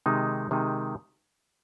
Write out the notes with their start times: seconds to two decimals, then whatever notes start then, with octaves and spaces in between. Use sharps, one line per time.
0.06 C3 D#3 G#3 D#4
0.51 C3 D#3 G#3 D#4